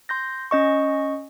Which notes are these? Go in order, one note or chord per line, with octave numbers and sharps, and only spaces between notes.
C6 G6 A#6
C#4 D#5 C#6